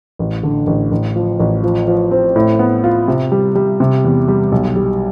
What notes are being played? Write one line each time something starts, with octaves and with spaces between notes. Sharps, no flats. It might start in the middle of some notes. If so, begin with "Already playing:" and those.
A1
D3
A1
A1
F3
A1
F3
F3
C4
A2
B3
F4
C3
G3
G3
C3
E2
G3
B1
G3